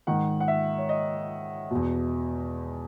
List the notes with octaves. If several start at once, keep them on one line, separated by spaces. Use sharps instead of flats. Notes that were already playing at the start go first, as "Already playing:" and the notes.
G#2 D#3 F#5
F#5
E5
C#5
D#5
E2 B2